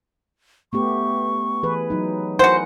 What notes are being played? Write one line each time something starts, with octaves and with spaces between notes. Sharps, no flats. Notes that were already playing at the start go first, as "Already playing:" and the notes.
A3 B3 G4 C#6
E3 G#4 B4
F#3 D#4
E4 F#4 A#4 C5 F#5 G#5